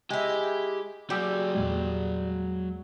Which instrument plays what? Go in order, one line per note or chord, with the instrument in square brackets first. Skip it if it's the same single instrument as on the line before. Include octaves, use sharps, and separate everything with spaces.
[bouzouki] G#3 E4 [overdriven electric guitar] G4
[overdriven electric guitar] F#3 G#4 [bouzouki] G3 [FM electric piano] F#4 D6 E6
[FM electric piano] E2 A#2 G#3